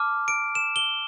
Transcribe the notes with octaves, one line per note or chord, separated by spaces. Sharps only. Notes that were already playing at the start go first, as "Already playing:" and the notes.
Already playing: A5 D6 F6
D7
E7
G7